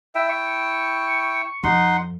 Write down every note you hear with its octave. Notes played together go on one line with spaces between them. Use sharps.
E4 E5 G5
C#6
F2 D#4 F#5 C6